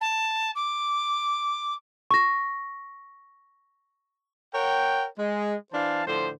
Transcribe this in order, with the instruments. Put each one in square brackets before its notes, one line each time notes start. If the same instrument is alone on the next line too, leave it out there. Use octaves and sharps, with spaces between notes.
[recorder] A5
D6
[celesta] C#6 A#6
[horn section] A#4 C#5 F#5 G5
G#3
E3 D4 C5 F5 A5
A2 D3 F3 C5